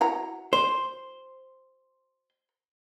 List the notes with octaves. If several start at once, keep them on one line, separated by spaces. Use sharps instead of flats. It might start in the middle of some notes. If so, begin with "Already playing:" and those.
E4 F#4 A#5
C5